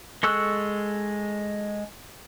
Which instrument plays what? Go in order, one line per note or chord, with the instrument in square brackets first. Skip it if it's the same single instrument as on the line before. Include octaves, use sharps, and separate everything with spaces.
[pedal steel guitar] G#3 A4 C#6 E6 F#6